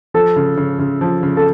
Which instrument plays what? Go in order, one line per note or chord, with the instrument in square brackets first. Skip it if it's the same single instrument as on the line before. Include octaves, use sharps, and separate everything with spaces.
[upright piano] F3 [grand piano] A4
[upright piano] C#3
C#3
C#3
F3
C#3
[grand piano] A4